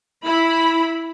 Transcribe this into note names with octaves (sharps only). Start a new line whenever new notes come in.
E4 B5